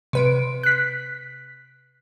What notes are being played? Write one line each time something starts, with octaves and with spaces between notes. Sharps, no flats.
C3 B4 D7
F#6 B6